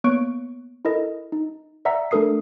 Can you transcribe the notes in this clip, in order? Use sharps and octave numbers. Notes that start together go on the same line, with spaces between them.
A#3 B3 C#5 C#6 F#6 D7
E4 A4 A#4 D#5
D#4
D5 E5 F#5 A#5 E6 B6
A3 D4 A4 A#4 D#6 C7